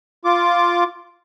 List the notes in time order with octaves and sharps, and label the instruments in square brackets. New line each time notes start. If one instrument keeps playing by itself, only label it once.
[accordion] F4 D6